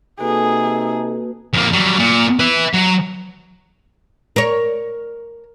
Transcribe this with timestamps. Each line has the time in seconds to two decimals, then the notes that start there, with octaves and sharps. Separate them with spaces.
0.20 C3 A#3 D#4 F#4 G#4 A4 B4
1.53 F2 A#3
1.73 F#3 G3
1.99 A#2
2.40 B4 E5
2.73 F#3
4.36 A#4 C#5